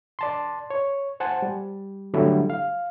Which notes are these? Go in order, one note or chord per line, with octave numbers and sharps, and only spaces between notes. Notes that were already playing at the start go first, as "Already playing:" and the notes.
D5 A5 C6
C#5
C5 F#5 G#5 A5
G3
D3 F#3 G3 A3 E4
F5